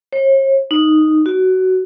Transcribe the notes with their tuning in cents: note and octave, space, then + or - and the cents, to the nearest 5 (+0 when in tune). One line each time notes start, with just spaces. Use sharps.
C#5 -45
D#4 -5
F#4 +15